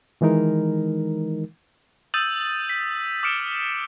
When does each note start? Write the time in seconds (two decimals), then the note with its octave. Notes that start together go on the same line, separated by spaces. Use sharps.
0.21 D#3 E3 G#3 D#4 A#4
2.14 D#6 E6 G6 A6 D#7 F#7
2.70 B6
3.23 D6 D#6 F6 C#7 D7 E7